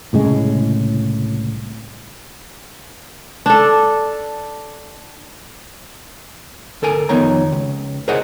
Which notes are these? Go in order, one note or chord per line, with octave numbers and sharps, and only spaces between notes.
C2 A2 C#3 G#3
D4 A4
D2 A4 A#4 G#5
F2 D#3 B3 D#4 C#5 A#5
C#2
G#4 A#4 C5 C#5 D#5 F#5